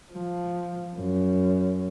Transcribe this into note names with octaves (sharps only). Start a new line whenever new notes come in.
F3
F#2